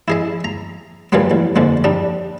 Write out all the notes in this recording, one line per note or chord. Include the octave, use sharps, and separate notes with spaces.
E4 G#4 D#5
A#5
A#2 C#3 F#3 G3 A#3 B3
A1
F2 G#2 D3 A#3
G3 D4 D#4